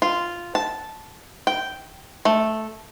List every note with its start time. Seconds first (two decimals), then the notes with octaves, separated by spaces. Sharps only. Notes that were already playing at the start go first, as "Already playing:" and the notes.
0.02 F4
0.55 A5
1.47 G5
2.25 A3